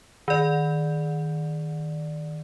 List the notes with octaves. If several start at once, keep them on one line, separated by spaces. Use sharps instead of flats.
D#3 D5